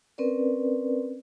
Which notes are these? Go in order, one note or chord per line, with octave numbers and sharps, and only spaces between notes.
C4 C#4 A#4 B4 D5